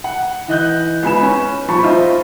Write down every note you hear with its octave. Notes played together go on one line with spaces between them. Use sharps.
F#5
E3 D#5 F#6 G6
C#2 B3 G#5 B5 E7
C#4
D#1 F3 A5 B5 C#6
F4 C5 D#5 E5